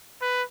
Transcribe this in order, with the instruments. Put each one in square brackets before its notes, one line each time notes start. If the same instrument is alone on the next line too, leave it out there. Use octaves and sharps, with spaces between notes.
[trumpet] B4